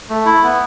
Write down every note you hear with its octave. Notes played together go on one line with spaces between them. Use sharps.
A3
E4
B3